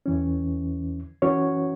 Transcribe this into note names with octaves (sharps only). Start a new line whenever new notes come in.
E2 E3 C#4
E3 C#4 F#4 C#5